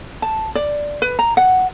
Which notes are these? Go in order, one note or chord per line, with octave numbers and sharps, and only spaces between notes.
A5
D5
B4
A#5
F#5